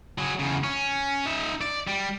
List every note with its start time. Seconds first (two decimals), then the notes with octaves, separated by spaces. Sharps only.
0.18 F#3 G#4
0.39 E2 C#3
0.64 C#4
1.26 D#4 E5
1.61 D5
1.87 G3